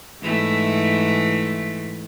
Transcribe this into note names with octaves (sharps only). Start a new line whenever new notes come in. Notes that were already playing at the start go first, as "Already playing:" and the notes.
G#2 E3 A3